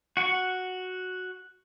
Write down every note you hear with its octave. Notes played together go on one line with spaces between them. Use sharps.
F#4 F#5 C#6